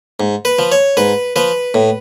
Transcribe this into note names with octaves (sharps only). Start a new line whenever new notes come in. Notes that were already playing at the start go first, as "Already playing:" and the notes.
G#2
B4
F3
C#5
G#2 B4
F3 B4
A2